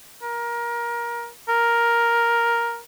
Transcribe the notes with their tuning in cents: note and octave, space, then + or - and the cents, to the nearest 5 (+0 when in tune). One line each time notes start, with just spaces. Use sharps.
A#4 +20
A#4 +5